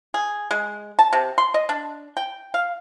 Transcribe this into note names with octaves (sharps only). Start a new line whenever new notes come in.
G#4
G#3
A5
C3
C6
D#5
D4
G5
F5